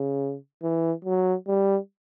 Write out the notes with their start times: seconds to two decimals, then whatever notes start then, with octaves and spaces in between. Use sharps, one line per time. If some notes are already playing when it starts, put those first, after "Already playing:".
Already playing: C#3
0.63 E3
1.05 F#3
1.47 G3